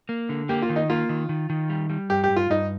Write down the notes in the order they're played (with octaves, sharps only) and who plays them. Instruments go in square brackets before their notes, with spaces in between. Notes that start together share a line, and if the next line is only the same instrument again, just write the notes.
[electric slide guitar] A#3
D3
[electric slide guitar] A#3 [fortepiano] G4
[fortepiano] F4
[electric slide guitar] D#3
[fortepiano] D#4
[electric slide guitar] A#3 [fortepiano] F4
[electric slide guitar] D#3
D#3
D#3
G3
G3
[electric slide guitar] G2 [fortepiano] G4
[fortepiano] G4
[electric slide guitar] G2
[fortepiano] F4
[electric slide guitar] G2 [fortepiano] D#4